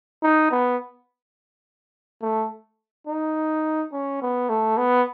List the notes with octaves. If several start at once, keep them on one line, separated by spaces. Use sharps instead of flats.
D#4
B3
A3
D#4
C#4
B3
A3
B3